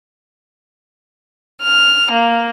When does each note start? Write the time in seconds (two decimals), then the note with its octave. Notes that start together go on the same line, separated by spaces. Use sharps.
1.62 F6
2.10 A#3